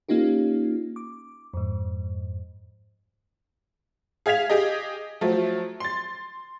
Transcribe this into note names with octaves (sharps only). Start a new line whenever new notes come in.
A#3 C#4 D#4 F4 G4
D6
F2 G#2
G#4 F5 G#6 B6 F7
G4 G#4 D#5
F3 F#3 A3
C6 A6